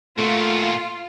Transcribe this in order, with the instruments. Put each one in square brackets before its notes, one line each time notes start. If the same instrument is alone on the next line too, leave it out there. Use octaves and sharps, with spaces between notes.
[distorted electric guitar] A#2 F#4 [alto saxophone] A3 [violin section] F4